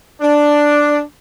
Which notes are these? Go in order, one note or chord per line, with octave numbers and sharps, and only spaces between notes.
D4